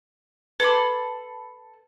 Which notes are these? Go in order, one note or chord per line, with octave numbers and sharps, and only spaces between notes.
A4 B4 B5 C6 D6